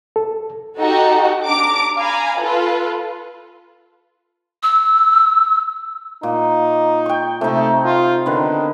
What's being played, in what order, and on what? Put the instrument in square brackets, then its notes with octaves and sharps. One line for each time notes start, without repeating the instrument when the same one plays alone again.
[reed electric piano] A4
[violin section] D#4 F#4 G4 A4
D4 A#5 D6 D7
F5 G#5 A#5 B5
F4 A4 B4
[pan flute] E6
[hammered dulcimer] A#2 [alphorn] D#4
[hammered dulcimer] G5 C#6
[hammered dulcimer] C3 D#4 [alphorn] A3
[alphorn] F4
[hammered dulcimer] D3 B3 [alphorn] D#3